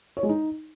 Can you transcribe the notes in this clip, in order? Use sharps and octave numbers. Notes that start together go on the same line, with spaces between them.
C#5
G#3
D#4